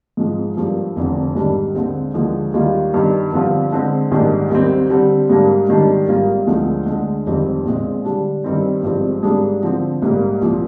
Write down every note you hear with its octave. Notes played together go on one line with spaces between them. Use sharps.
G#2 F3 G#3
G2 F3 A#3
F1 F2 D3
G#2 D#3 G3 D4
D#2 D3 G#3 C4
D#2 D3 F3 G#3
D#2 D#3 G3 A#3 F4
G1 G2 D#3
G2 D3 F3 C4 F4
D3 G#3 C4
A#1 G#2 D#3 G3 D4
D#2 D#3 G3 C4
D3 G3 C4
G#2 G3 A#3 D4
G#2 D#3 G3 D4
G#1 G#2 G3 A#3 F4
D2 D3 F3 G#3
D2 D3 G#3
F1 F2 D#3 G3 C4
A#1 A#2 G#3 C4
D3 G3 D4
G2 D#3 G3 C4
G#1 G2 F3 G#3 C4
G#2 G3 A#3 D4 G#4
D3 F3 C4
A#1 G#2 G3 A#3
C2 A#2 F3